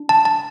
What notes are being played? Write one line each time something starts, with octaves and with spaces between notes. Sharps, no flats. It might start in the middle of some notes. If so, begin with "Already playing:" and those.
Already playing: D4
A5
A5